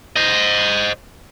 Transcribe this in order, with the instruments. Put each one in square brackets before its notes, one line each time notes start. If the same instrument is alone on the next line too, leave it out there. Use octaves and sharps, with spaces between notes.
[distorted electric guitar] C5 D#5